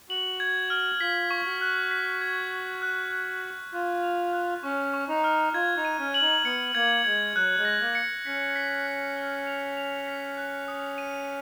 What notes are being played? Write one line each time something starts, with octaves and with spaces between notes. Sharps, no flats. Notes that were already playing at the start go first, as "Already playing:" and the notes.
F#4 F#7
G#6
F6
F4 B6
C#6
F#4
F#6
B6
G#6
G#6
F#6
F#6
B6
F4 F#6
F7
F#6
C#4 C#6
C#6
D#4
F6
F4 G#6
D#4
D#7
C#4
F#7
D#4
B3 C#7
A#3 G#6
G#3 G#6
F#3 F#6
G#3
A#6
A#3
C#7
C#4 B6
B6
F#6
F6
F7
F7
B6
F#6
D#6
D#7